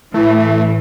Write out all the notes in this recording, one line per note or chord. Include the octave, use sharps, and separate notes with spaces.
A2 E3 A3 E4